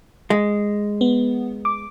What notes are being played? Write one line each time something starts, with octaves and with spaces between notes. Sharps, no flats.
G#3
B3
D6